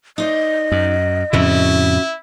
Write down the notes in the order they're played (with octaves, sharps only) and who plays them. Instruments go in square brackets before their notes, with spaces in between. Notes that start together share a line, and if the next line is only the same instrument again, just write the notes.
[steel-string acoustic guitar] D#4 C5 D5 [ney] D#5
[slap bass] F#2
[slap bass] F2 A2 C#3 [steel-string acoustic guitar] C#4 F#4 C5 [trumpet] E4